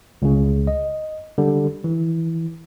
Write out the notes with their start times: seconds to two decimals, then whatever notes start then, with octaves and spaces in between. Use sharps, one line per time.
0.22 C#2 C#3
0.67 D#5
1.38 D3 G3
1.84 E3